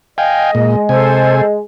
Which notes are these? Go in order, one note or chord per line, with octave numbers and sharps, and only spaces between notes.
D#5 F5 G5 G#5
A#2 G#3
C3 A4 C5 G#5